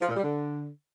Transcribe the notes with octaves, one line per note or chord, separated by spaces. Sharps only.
F3
A#2
G3
D3